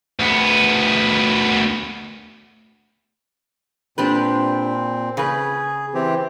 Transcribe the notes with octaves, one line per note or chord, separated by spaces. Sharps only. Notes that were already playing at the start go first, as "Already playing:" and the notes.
D2 B3
A#2 C4 D4 G4 B4
C#3 G#4 B4
E3 C4 G4